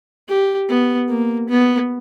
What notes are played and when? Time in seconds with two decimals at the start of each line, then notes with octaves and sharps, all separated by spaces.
0.28 G4
0.69 B3
1.09 A#3
1.50 B3